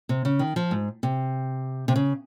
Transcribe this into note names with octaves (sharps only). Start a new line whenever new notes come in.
C3
C#3
D#3
F3
G#2
C3
C3
C#3